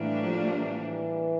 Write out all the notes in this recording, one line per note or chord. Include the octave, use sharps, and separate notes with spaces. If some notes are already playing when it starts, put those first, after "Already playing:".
Already playing: A2 E3 G3 A#3 D4
F3
E3